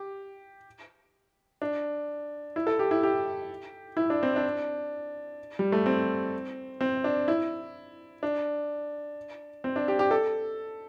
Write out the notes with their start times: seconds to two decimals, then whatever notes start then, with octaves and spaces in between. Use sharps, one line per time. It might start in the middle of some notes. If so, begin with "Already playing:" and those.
Already playing: G4
1.62 D4
2.56 E4
2.67 A4
2.79 G4
2.91 E4
3.03 G4
3.97 E4
4.10 D4
4.23 C4
4.36 D4
5.59 G3
5.72 A3
5.86 C4
6.81 C4
7.04 D4
7.28 E4
8.23 D4
9.64 C4
9.76 D4
9.88 G4
9.99 G4
10.11 A4